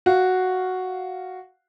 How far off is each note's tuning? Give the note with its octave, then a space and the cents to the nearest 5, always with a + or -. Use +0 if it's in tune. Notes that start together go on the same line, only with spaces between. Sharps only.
F#4 +0 F5 +0